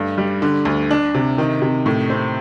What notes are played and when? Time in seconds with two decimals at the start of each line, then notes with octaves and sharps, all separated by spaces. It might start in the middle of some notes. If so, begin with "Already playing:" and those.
Already playing: G2 A3
0.18 G3
0.42 D3
0.65 D2
0.91 D4
1.14 C3
1.38 D#3
1.62 C3
1.86 A2
2.10 C4